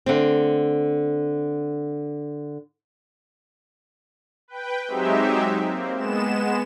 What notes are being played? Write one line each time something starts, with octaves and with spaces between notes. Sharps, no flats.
D3 A3 C4
B4 G5
F#3 G#3 C4 D#4 G4 E5
A#3 C4
G#3 B3 E7